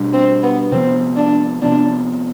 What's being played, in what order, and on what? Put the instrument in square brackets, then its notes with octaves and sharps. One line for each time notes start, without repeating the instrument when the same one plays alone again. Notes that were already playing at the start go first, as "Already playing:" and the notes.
Already playing: [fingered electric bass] B2 G3 D4
[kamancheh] C4
B3
[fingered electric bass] C3 F3 B3 [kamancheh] C4
[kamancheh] D4
[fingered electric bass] C3 F3 B3 [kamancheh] D4